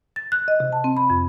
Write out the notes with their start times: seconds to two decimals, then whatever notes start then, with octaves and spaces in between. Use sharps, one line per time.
0.16 A6
0.32 F#6
0.48 D#5
0.60 C3
0.73 A5
0.84 C4
0.97 B5
1.10 F2